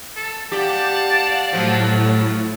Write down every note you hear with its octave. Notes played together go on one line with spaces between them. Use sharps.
A4
G4 D5 F5 F#5 A5
A2 F3 F#3 A4